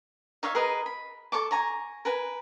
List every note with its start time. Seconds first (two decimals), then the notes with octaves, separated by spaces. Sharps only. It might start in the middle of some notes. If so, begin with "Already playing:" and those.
0.43 D#4 C#5 E5 F5
0.55 G#4 A#4 B4 D#5
0.86 B5
1.32 A4 A5 C#6 D6
1.51 G#5 A#5 C#6
2.05 A#4 B4 G#5